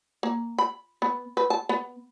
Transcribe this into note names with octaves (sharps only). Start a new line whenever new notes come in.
A#3
B5
B3
B4
A5
B3